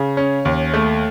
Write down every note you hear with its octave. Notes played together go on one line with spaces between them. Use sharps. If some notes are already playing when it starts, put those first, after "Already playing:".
Already playing: C#3
C#4
D#2
A3